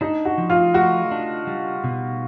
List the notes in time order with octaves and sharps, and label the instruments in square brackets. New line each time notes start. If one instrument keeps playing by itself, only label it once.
[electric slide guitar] D4 [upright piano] D#4
[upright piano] F#4
[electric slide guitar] F3
[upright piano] F4
[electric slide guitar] A3 [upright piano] F#4
[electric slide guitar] D4
G3
B2